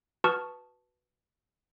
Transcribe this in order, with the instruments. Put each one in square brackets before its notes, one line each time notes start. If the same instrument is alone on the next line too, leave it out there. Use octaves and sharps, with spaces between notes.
[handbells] F#4 B4 A5 C#6 D#6 F6